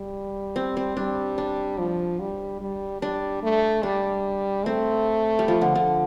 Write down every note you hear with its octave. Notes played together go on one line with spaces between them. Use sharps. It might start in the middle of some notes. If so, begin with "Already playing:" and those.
Already playing: G3
C4
C4
G3 D4
D4
F3
G3
G3
G3 D4
A3
G3 D4
A3 C4
G3
F3
D3
D3